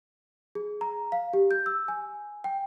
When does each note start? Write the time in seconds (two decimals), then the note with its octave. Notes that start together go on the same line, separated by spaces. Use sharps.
0.55 G#4
0.81 A#5
1.12 F5
1.33 G4
1.51 G6
1.66 E6
1.88 G#5
2.44 G5